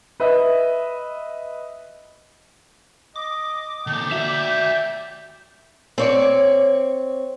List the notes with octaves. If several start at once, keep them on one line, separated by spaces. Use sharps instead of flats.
B4 D#5 E5
D#5 D6
D3 A#3 G5
F#4 D5 E5
C4 C#5 D5